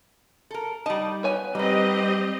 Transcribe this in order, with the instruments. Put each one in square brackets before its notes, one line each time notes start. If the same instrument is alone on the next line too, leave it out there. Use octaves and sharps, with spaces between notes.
[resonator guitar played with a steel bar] A4 A#4
[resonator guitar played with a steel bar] G3 D#4 [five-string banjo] A5
[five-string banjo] B3 C#5 G#5
[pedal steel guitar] G3 [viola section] C4 G4 D#5 [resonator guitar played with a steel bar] D#4 B4